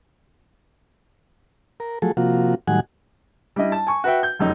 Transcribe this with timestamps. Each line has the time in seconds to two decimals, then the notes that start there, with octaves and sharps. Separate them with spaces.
1.80 A#4
2.02 F3 F#3 A3 G#4 A4
2.17 C3 F3 A#3 F4 F#4
2.68 A2 D#3 F#3 G3 F#5 G#5
3.56 G3 D4 E4 D#5
3.72 A5
3.87 G#5 C#6
4.04 F#4 B4 E5 G5
4.23 G6
4.39 F1 F#2 D#4